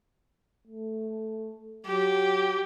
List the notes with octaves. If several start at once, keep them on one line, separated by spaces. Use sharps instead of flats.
A3
F#3 G4